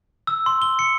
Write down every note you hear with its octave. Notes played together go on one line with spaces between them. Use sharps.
E6
C6
G7
C#7